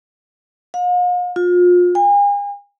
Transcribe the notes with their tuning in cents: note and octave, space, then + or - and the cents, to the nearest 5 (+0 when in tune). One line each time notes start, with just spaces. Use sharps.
F5 +45
F4 +30
G#5 -40